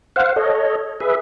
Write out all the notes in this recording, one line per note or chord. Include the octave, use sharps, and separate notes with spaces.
C5 F5 F#5
A4 C#5 D#5
G#4 B4 E5